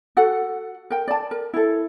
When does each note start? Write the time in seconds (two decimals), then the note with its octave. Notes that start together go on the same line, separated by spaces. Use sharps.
0.17 F#4 A4 F#5
0.90 A#4 G5
1.08 D5 A5
1.31 A#4
1.54 E4 A4